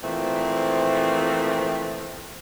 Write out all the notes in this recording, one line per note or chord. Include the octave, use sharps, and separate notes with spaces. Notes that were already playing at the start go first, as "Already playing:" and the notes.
A#2 E3 F3 A3 C4